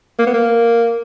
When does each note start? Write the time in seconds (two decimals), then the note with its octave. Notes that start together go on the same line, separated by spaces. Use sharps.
0.19 A#3
0.27 B3
0.34 A#3